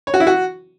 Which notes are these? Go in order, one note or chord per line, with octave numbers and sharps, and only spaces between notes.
C#5
F#4
E4
F#4